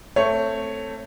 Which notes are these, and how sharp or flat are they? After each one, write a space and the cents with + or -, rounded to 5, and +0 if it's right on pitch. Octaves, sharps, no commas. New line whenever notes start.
A3 +15 C4 +0 C#5 -5